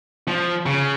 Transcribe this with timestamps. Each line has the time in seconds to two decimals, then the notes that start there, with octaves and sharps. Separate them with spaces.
0.28 F3
0.66 C#3